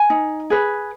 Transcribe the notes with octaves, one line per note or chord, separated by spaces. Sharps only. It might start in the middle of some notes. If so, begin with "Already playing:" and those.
Already playing: G#5
D#4
G#4 B4